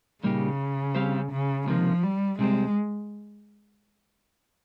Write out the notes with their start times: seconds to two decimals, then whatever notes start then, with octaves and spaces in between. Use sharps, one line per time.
0.24 A#2 C#3 G3 A#3 D#4 G4
0.95 G3 C4 G4 C5 F5
1.31 C#3
1.67 C#2 C3 D#3 F3 A#3
2.03 G3
2.39 C2 C3 G3 G#3 C4